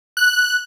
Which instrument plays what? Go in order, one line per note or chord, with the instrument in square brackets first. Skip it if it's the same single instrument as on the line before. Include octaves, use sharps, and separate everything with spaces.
[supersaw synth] F#6